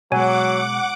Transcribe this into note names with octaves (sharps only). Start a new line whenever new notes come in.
B2 F#3 G#3 C#5 F#5 G#5 D6